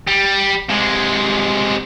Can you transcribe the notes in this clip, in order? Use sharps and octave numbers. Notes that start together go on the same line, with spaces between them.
G3
C3 G#3